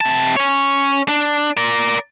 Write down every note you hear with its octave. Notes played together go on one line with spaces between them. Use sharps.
C3 A5
C#4 C#5
D4
A#4 D5